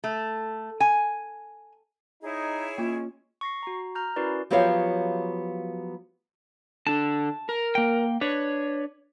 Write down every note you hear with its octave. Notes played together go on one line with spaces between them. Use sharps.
A3
G#5
D#4 E4 G#4 C#5
G#3 A#3 C#4 F4
C#6 A#6 C7
F#4 A#5
A#5 F6 G6
C#4 E4 F#4 A#4 B4 D5
F3 F#3 B3 G4 C#5 F5
D3 D4 A5
A#4
A#3 G5
D4 B4 C#5